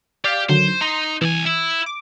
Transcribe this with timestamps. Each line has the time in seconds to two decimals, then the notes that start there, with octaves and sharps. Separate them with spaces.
0.24 G4 D5 F5
0.49 D3 D#3 F#3 C5
0.81 D#4 A#5 C6
1.21 C2 E3 G#5
1.46 E4
1.86 D6